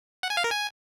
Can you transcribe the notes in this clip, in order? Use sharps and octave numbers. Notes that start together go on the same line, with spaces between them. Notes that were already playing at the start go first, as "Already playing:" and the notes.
F#5
G#5
F5
A#4
G#5